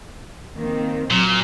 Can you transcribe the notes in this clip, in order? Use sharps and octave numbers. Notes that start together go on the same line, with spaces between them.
D#3 A#3 C4
A#2 F#3